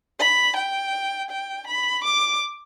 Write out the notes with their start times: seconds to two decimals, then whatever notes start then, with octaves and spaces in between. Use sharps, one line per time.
0.20 B5
0.56 G5
1.30 G5
1.67 B5
2.04 D6